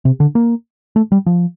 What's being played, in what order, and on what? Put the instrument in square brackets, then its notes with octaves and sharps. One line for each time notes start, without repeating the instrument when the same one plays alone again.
[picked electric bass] C3
D3
A#3
A3
G3
F3